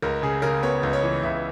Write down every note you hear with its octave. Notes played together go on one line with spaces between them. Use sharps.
C#2 A#4
C#3 G#4
C#3 A#4
B3 C#5
C#2
C#5
E3
C#2 E5